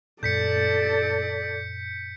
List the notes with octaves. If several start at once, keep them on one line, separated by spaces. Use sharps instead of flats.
F#2 A#2 A4 D5 G6 B6 C#7